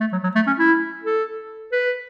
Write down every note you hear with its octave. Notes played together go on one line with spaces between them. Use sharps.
A3
F#3
F#3
A3
C#4
E4
A4
B4